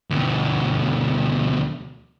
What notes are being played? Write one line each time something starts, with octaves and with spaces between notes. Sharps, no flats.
D2 B2